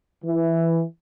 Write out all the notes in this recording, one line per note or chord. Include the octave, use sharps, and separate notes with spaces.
E3